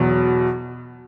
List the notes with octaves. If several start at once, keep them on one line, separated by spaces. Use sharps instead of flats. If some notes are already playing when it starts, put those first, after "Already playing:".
Already playing: E2 B2 F#3